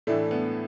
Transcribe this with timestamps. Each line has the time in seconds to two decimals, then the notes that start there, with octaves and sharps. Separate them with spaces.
0.07 A2 E3 A3 D4
0.31 B3